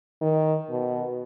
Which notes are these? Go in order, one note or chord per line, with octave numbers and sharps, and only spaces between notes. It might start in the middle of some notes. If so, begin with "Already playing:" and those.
D#3
B2